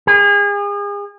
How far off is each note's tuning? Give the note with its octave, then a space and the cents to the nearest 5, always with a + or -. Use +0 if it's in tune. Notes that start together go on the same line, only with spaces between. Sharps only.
G#4 -35